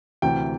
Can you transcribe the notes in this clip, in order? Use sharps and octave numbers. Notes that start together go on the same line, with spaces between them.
D2 C3 E3 G5